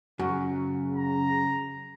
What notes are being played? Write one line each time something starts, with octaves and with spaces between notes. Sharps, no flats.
F#2 C#3 F#4
A#5